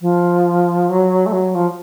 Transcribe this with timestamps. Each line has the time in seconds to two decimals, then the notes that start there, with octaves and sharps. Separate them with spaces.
0.01 F3
0.88 F#3
1.26 A3
1.32 F#3
1.54 F3